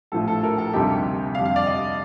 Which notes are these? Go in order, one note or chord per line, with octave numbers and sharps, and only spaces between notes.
A#1 A2 F3 A3 A4
A4
A#4
A4
D2 C3 G3 A#3 D#4 G4
F2 D3 G3 D4 F5
F5
D5
D#5